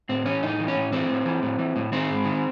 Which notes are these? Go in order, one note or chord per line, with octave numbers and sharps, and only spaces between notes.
A2 C4
E3 C#4
A2 D#4
E3
C#4
A2
E3 C4
A2
E3
A2
E3
A2
D#3 C4
G#2
D#3